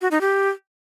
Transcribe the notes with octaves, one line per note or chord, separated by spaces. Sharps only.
F#4
D#4
G4